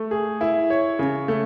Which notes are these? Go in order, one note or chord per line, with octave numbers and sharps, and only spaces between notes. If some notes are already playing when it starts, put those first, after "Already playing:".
Already playing: A3
G#4
E4
C#5
C#3
A3